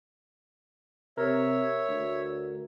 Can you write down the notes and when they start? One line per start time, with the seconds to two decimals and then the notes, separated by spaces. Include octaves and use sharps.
1.18 C3 A#4 C#5 E5
1.88 D2